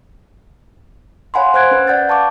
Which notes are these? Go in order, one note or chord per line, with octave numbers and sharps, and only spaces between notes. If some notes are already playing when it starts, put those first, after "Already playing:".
C#5 F5 F#5 G#5 B5 C6
C5 F#5 F#6 G#6 D7
C#4 B4
D5 F#5 G6 A6
F5 A5 C#6 D6